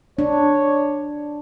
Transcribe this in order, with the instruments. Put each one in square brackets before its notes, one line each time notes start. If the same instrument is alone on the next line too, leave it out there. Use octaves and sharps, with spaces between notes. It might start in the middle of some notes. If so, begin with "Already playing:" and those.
[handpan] D4 [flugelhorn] C#5